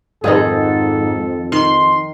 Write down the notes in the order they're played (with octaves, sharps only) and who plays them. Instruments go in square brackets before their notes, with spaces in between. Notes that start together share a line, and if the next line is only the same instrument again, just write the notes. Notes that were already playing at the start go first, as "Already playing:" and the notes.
[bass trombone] F2 [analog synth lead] G#2 [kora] D#3 D#4 G#4 [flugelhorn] A4
[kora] D#3 [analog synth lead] C6